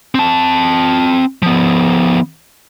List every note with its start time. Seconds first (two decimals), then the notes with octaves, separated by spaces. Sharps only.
0.15 C4 A5
1.42 F3 B3